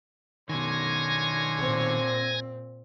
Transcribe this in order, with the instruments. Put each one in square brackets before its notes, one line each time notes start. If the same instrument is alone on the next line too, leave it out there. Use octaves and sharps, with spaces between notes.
[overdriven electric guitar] B2 D#3 [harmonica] D3 C#5 C6 [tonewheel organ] G#5 G#6 A#6
[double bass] A#2 C4